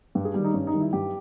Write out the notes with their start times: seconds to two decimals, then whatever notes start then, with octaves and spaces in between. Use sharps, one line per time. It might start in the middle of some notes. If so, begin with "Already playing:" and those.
0.15 G2 G4
0.25 G#4
0.34 D#3 G3
0.44 D#4
0.54 G2 C#4
0.67 D#4
0.74 D#3 G3
0.80 E4
0.93 G2 G4